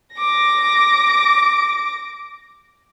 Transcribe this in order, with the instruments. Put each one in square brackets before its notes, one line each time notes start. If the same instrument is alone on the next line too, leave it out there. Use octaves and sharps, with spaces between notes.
[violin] D6 A#6